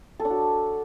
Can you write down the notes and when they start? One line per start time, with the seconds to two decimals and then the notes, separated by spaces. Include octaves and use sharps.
0.20 A4
0.25 D4
0.30 F#4